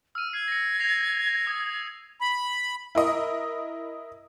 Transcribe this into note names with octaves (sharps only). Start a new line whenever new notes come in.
E6 F6 D#7
G#6 C7
A#6 C#7
A#6 C7 F7
D#6 E6 A#6
B5
E4 A#4 D#5